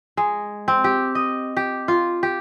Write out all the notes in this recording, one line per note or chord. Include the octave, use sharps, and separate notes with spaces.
G#3
C4
G4
D#5
G4
F4
G4